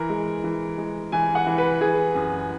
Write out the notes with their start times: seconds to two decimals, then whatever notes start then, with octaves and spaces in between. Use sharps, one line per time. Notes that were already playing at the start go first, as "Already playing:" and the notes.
Already playing: E3 A#4
0.10 G#3
0.44 E3
0.78 G#3
1.12 E3 G#5
1.35 F#5
1.47 E3
1.58 B4
1.81 E3 G#4
2.15 F#2